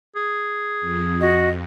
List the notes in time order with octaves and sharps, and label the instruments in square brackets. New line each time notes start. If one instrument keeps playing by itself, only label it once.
[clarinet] G#4
[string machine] F2
[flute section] F#4 D#5